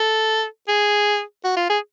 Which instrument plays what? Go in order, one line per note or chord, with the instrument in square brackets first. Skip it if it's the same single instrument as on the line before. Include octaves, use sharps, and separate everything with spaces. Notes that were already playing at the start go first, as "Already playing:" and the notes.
Already playing: [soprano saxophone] A4
G#4
F#4
F4
G#4